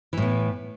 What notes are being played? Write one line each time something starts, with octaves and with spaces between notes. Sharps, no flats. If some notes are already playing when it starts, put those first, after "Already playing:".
A2 E3 B3